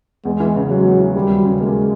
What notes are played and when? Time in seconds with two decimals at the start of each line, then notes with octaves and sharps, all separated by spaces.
0.25 E2 G#3
0.40 E3
0.56 C#3
0.70 F#3 G#3
0.85 E2
1.00 E3
1.15 D#2 G3
1.30 F#3
1.45 C#3
1.60 G#3 A#3